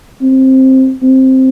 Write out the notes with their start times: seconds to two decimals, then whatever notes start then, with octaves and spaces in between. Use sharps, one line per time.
0.22 C4
1.03 C4